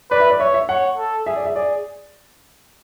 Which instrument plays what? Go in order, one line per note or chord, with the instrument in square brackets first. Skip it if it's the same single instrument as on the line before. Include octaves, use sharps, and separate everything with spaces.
[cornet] B4 [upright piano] D5
[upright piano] E5
D5
[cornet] C#5 [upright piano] E5
[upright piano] E5
[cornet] C#5 [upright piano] F#5
[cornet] A4
[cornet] G#4 [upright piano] E5
[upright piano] D5
E5
[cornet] G#4 [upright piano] D5